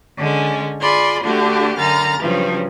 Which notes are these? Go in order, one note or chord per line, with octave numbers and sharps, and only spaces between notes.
D3 G#3 C#4
F4 G#4 D5 B5 C6
D3 A3 D4 F#4 G4
F#2 D3 A#5 F6 A6
G2 C#3 F3 F#3